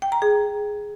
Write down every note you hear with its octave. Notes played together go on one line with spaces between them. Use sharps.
G5
A#5
G#4